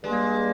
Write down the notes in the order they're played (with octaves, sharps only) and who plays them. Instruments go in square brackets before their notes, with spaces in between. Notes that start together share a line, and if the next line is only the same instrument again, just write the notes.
[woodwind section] G2 G3 A#3 [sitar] G#3